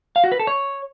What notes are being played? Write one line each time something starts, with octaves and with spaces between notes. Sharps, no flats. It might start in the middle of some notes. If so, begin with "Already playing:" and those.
F5
F#4
B4
A4
C#5